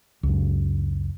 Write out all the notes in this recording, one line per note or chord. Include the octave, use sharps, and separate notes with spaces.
C#2 F#2